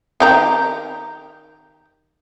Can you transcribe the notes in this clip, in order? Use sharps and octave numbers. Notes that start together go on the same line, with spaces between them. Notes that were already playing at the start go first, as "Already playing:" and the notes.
D#3 G4 A#5